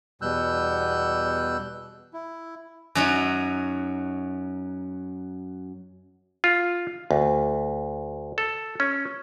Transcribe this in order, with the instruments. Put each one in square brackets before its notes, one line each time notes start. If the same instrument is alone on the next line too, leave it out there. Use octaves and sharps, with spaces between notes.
[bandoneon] E2 B2 G3 E6 F#6 G6
E4
[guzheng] F#2 F#3 D#4
[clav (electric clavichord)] F4
D2
A4
C#4